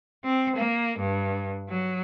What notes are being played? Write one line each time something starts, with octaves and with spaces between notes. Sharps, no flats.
C4
A#3
G2
F#3